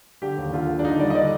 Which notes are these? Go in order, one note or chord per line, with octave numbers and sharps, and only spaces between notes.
D3 G4
D#2
D3 F4
D3
D4
D3 D#4
G3 D5
D#5
D3 D5